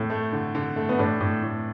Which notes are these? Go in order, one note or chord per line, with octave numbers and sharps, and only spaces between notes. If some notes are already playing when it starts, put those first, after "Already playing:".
Already playing: A2
A3
D3
D3
A3
B3
A2 D4
A2
A2